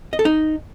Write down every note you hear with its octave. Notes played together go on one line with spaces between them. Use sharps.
D#5
A4
D#4